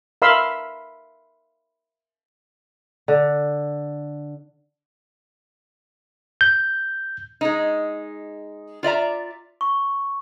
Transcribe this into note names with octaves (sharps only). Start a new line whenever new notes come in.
A#4 E5 F5 B5 C6 E6
D3
G6
G#3 D#4
F4 D5 E5 A#5
C#6